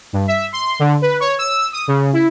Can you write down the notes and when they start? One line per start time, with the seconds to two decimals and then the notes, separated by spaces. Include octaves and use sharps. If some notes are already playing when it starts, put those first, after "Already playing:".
0.13 G2
0.27 E5
0.53 C6
0.79 D3
1.02 B4
1.20 C#5
1.39 E6
1.72 D#6
1.88 C#3
2.13 E4